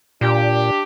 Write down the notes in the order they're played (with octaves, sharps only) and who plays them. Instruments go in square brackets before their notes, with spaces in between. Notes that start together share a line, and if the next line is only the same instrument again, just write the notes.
[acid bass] A#2 [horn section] D4 G4